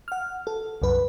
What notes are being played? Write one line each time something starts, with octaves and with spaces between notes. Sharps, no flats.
F#5 F6
A4
C2 F#2 B4